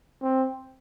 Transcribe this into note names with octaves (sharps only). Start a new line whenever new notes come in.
C4